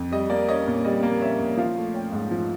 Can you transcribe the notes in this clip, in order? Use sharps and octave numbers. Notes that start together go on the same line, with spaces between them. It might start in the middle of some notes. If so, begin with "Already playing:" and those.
Already playing: F2
G3 D#5
A#3 D5
C#4 D#5
A#2
G3 D#5
A#3
C#4 E5
A#2
F3 F5
A3
C#4 G5
G#2
F3